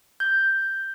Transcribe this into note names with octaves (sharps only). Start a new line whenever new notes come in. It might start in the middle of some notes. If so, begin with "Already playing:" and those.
G6